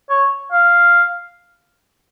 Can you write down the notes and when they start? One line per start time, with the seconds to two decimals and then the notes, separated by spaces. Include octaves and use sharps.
0.10 C#5
0.52 F5